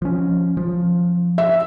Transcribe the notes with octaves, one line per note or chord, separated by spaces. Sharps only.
F3 C#4
F3
E5